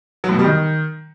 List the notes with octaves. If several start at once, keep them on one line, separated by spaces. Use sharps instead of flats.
F#3
A2
B2
G3
D#3